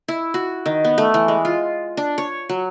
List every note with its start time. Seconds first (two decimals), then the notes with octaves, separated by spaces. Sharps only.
0.08 E4
0.34 F#4
0.66 D#3
0.84 B3
0.98 A3
1.14 E3
1.28 G#3
1.45 F4
1.97 D4
2.18 C#5
2.49 F#3